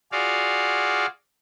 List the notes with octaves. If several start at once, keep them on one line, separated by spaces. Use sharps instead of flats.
F4 F#4 G#4 D5 F5